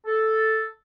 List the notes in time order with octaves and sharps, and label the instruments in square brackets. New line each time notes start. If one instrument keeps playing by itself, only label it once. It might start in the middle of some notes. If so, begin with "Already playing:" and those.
[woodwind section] A4